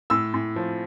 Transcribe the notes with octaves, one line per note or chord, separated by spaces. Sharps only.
A2 E6
A2
F3